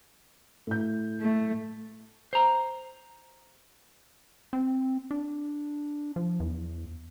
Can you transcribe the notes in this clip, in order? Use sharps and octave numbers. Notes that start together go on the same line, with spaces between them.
A2 G6
A3
C5 A#5
C4
D4
F3
E2